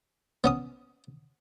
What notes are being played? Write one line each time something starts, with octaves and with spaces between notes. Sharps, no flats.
B3 C#4 D#6